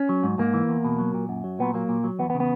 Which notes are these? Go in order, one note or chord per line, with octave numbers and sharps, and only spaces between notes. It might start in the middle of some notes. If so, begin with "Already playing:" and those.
Already playing: C#4
F#3
G#2
G#2 A#3
E3
E2
B2
F#3
A#2
F#2
F#3
A#2 B3
F#3 A#3
A#2
F#3
E2 B3
B3
C#3
B3